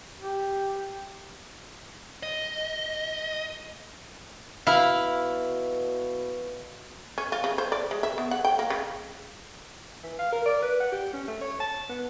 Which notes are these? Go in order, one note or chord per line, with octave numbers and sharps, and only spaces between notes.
G4
D#5
B2 E4 F5
C#4
F4
C#3
C5
D5
G#3
E5
B3
F#5
G5
A#3
C#3
E3
F5
A#4
D5
B4
F#5
G4
C#4
A3
C#5
A5
B3